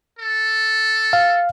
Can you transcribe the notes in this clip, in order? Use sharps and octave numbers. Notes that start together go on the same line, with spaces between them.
A4
F5